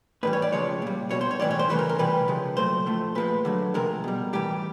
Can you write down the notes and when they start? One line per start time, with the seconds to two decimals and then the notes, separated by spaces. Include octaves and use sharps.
0.23 A2 E3 G3 B4
0.33 C#5
0.42 D5
0.52 C#3 F3 G#3 C#5
0.82 A#2 G3
1.11 B2 G3 C#5
1.21 C5
1.31 C#5
1.40 A2 E3 G3 D5
1.51 C#5
1.59 C5
1.69 C#3 E3 A3 B4
1.79 A#4
1.89 A#4
1.99 C3 E3 G3 B4
2.28 C#3 F3 G#3
2.57 A#2 F#3 A3 C5
2.86 A2 F3 A3
3.15 A#2 F3 G#3 B4
3.45 D3 F#3 A3
3.74 C3 F3 G#3 A#4
4.04 B2 G3
4.33 A2 E3 G3 G4